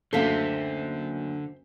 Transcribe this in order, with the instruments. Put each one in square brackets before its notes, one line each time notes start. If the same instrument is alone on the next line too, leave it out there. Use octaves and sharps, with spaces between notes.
[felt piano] F#1 D2 [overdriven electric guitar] D3 [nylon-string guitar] A4 F5 [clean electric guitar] C5 E5 G5